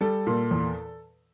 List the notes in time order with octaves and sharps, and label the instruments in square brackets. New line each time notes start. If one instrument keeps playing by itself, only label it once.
[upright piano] G3 A4
A#2
E2